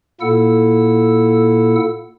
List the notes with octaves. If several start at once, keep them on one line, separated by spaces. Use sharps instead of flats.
A#2 A#3 E4 A4 F#5 E6